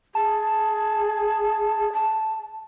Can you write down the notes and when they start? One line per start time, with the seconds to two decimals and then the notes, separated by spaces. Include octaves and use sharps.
0.15 G#4 A5
1.93 A5